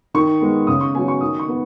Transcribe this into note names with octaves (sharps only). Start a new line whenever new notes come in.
D#3 C#6
G#3 B3
C#3 D#6
C#6
F#3 B3 G#5
C#6
D#3 D#6
C#6
B3